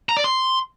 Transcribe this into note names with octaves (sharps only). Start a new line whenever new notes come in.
A#5
D5
C6